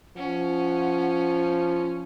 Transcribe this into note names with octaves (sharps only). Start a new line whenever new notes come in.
F3 C#4 F#5